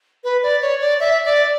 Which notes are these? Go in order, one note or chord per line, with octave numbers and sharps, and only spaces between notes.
B4
D5
C#5
D5
E5
D5